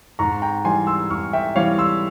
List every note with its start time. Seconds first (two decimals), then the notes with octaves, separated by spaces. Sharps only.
0.19 G#2 A#5 C#6
0.42 G5 A#5
0.64 E3 G3 G#5 C6
0.87 C6 E6
1.10 G#2 C#6 F6
1.33 E5 G5
1.56 E3 G3 C#5 F5
1.78 C6 E6